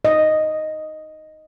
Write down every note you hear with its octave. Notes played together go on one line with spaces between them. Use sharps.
D#5